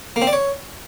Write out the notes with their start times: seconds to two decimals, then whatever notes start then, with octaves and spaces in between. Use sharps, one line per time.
0.16 A#3
0.22 C4
0.27 D5
0.33 C#5